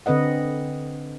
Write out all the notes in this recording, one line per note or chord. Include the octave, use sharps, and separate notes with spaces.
D3 C4 B4 D#5 F#5